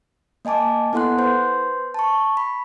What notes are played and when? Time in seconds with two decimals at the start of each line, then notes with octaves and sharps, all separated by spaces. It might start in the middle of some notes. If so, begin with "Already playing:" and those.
0.45 A#3 D#5 G#5 A5 D6
0.93 B3 E4 A4 F#5 C6 F#6
1.18 B4 C5 C6 G6
1.94 A5 C#6
2.37 B5